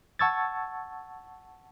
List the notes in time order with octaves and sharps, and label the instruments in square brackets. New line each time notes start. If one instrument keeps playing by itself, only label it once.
[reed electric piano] F#5 A5 C#6 E6 G#6 A6